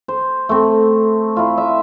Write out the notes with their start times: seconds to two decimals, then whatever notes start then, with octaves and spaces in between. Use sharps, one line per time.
0.08 C5
0.49 A3 C4
1.37 E4 F4
1.58 E5